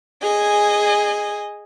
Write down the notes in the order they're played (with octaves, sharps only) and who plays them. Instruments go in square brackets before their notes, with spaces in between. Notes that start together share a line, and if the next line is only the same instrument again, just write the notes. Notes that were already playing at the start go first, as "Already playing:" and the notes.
[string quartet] G#4 D#5 G#5